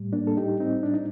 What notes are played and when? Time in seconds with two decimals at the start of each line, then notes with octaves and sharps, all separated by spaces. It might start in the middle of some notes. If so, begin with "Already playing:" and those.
Already playing: A2 G3
0.13 A#3 D4
0.27 A4
0.37 D#4 G4
0.60 C4 D#4
0.83 D4
0.94 D#4